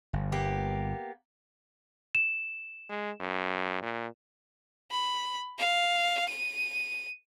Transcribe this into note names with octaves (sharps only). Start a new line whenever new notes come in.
G1
A#3 B3 G4
E7
G#3
F#2
A#2
B5
F5
D#7